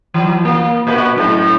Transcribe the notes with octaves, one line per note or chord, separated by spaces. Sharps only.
E3 F#3
A#3
A#2 F#4 B4
F#2 A2 A4